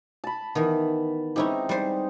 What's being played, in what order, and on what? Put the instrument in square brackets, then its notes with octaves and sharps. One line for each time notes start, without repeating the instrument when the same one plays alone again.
[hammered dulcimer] A5 B5
[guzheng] D#3 E3 [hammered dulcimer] B3
[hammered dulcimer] G#3 C4 D#4 [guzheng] C#4 E4 G4
[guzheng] G3 C5